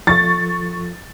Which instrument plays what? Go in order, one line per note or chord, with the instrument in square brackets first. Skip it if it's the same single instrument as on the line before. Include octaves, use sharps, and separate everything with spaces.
[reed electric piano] F3 F4 A4 [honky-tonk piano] C#6 A6